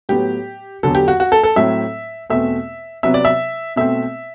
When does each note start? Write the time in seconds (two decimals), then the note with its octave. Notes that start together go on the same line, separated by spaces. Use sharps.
0.09 A2 F#3 B3 G4
0.83 E2 D3 F#3 A4
0.95 G4
1.08 F#4
1.20 F#4
1.32 A4
1.43 A4
1.56 A2 F#3 C4 E5
2.30 E2 B2 A3 C4 E5
3.03 C3 F#3 B3 E5
3.14 D5
3.25 E5
3.76 B2 A3 C4 E5